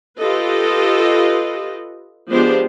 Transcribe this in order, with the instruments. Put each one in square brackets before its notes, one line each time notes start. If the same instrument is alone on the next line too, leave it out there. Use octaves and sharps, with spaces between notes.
[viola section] F4 G4 A4 B4 D#5
F3 G#3 B3 D4 G4 C5